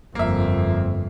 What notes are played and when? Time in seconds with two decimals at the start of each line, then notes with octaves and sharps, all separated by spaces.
0.15 G1 F2 A#3 E5